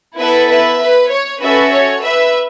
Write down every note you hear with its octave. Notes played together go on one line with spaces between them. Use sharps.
B3 E4 A4 B4 E5
B4 E5
B4
C#5
C#4 F#4 A4 B4 E5
C#5
B4 E5